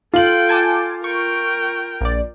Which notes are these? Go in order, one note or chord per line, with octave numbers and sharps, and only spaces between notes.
F4 A4 G5 F#7
G#5 A5 D6
A#4 G5 C#6
A#1 D5